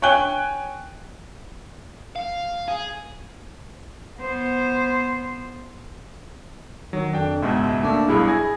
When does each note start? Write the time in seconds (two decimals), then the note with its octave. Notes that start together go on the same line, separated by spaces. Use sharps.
0.02 C#5 G5 G#5 F#6 G7
2.16 F5
2.68 G#4
4.20 B3 C5
6.93 D#3 F#3
7.13 F2 D4 G5
7.42 C#2 G#2 B2 G#3 E5
7.83 A3 A#3 D4
8.08 B1 G2 E4 G#4
8.28 G#5 G#6 A#6